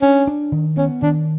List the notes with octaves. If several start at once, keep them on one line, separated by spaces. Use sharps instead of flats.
C#4 D4
D4
D#3
B3 C#4
D#3 D4